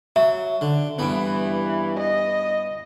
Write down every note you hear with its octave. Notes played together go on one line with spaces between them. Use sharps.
F#3 E5
D3
G2 E3 B3
D#5